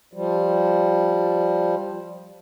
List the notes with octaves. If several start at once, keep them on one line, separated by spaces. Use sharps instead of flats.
F3 G3